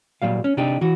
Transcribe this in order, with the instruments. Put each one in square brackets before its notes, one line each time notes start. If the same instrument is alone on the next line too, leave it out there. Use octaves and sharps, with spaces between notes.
[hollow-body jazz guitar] A#2 F#3 G3 F5
C#4
C3 D4 D#4 G4
E3 F#4